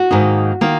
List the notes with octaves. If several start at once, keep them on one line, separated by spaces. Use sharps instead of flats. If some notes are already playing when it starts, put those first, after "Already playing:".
Already playing: F#4
G#2 D#3 A#3 D#4
D#3 A#3 D#4